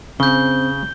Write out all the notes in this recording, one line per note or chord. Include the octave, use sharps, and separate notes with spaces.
C#3 C4 G6 G7